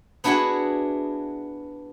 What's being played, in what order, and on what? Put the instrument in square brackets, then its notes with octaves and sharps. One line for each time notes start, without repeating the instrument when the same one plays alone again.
[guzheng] B3 D4 E4 F#4 G#4 F#5